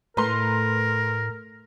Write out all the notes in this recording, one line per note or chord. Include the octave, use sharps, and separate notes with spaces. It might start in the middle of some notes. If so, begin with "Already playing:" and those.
A2 A3 A#4 B4 A#5 C6